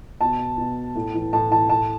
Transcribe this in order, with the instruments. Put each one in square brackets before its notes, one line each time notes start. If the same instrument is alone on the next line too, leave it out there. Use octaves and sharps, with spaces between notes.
[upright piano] B2 A5
B2
A2
E3
A2 A5
E3 A5
A2 A5